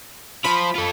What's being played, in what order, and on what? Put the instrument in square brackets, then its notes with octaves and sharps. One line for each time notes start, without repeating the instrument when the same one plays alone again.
[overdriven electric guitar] F4 C5 [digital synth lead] B5
[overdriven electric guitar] F4 A4